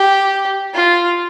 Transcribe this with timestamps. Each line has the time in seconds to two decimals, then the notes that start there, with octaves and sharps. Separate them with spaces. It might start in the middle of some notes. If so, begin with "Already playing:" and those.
Already playing: G4
0.74 F4